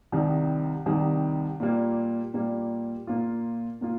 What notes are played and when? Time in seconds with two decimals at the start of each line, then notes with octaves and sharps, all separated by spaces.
0.12 C2 C3 D#3 G3
0.86 C2 C3 D#3 G3
1.60 A#2 G3 A#3
2.34 A#2 G3 A#3
3.07 A#2 A#3 F4
3.81 A#2 A#3 F4